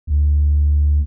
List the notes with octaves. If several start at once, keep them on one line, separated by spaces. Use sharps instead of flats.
D2